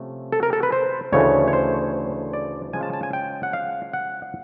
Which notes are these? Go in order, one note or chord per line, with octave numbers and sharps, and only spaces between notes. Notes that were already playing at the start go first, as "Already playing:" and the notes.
Already playing: C3 F3 A3 C#4
A4
A#4
A4
B4
C5
D2 C#3 E3 A3 C#5
C#5
C5
D5
C#3 F3 G#3 C#4 G#5
A5
A5
G#5
G5
F#5
F5
F#5